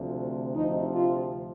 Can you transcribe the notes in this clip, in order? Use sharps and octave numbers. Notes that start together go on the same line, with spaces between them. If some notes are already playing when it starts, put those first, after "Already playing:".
Already playing: D2 C3 F3
D2 C3 F3 D#4
F4